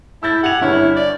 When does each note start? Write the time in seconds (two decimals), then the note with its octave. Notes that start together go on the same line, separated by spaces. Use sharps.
0.23 E4 E6 G6 A6
0.43 G4 F#5 G#6 F7
0.62 G1 E4 C#5 F6
0.96 D5